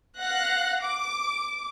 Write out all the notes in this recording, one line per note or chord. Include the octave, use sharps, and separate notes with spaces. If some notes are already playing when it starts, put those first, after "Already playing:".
F5 F#5 F#6 A#6
D6